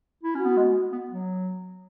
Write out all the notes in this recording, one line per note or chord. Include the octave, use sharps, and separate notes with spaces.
E4
C#4 F#4
B3
G#3
B3
F#3